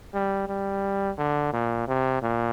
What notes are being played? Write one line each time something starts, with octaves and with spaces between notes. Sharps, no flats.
G3
G3
D3
A#2
C3
A#2